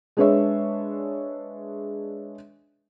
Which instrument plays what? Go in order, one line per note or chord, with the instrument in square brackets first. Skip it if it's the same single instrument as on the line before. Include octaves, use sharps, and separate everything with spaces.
[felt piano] G#3 D4 G#4 B4 C#5 E5